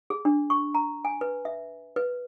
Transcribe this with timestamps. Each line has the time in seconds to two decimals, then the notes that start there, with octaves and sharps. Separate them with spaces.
0.10 G#4
0.25 D4
0.50 C#6
0.75 A#5
1.05 G#5
1.21 B4
1.45 E5
1.96 B4